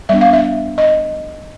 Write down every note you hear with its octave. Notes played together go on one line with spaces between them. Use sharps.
G3 B3 D4 E5
F5
E5
D#5